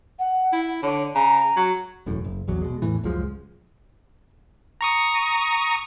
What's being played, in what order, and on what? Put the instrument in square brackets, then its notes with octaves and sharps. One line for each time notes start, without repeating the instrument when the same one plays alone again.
[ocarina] F#5
[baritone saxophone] E4
[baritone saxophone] D3 [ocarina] C#5
[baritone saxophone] C#3 [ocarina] A#5
[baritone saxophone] F#3
[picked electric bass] E1 F#2 A2
F#1
A#1 E2 F#3
B2 G#3
E2 A2 E3
C#2 F#2 F3 G#3
[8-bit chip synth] A#5 C#6 D#6